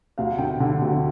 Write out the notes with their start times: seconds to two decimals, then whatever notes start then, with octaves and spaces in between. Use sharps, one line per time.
0.18 D2 F5
0.38 D3 G5
0.60 D3
0.82 D2